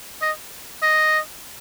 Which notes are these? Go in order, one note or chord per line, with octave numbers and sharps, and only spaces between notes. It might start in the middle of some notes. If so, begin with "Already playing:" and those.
D#5
D#5